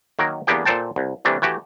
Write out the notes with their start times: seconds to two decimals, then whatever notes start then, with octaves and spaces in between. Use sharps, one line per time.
0.19 D#3 F#3 A#3 A#4
0.47 E2 A#3 B3 D4 G4 G5
0.65 A#2 A4 C5 G5 A5
0.96 C2
1.25 C3 E3 G3 A3 D4
1.42 E3 A3 F#4 G4